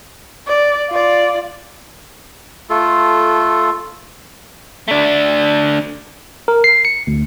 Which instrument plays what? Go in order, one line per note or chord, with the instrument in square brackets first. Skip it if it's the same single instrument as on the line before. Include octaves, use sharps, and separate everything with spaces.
[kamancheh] D5
F4 D5
[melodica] A3 F4 A4
[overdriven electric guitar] A3 D4
[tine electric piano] A#4
C7
C#7
D2